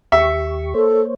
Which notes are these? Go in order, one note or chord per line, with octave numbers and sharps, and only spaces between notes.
D#2 G4 E5 C#6
A#3 A4 C5 C#5